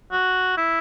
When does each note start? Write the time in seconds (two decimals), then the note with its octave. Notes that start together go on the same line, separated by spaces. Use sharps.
0.12 F#4
0.57 E4